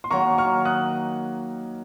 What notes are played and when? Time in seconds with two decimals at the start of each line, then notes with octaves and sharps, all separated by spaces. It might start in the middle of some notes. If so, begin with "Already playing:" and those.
0.04 C6
0.10 D#3 F#3 A#3 A#5 C#6
0.38 C#6 F6
0.65 D#6 F#6